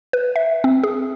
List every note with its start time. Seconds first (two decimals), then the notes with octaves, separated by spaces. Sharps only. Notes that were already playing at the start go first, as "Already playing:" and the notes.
0.13 B4
0.36 E5
0.64 C4
0.83 G#4